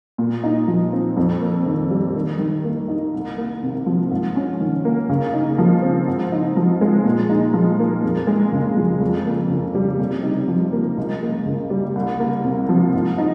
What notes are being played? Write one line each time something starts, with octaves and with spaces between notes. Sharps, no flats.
A#2
D#4
F3
C4
F2
A#3
D#3
G3
D#3
D#3
A#3
D#4
C2
A#3
C3
F3
G#2
C#4
D#3
A#3
C#3
D#4
F3
C4
G#2
D#4
F3
G#3
A#2
D#4
F3
A#3
F2
G#3
C#3
F3
F2
A#3
C#3
G3
C3
D#4
F3
A#3
C#2
A#3
C#3
G3
C2
A#3
C3
F3
G#2
D#4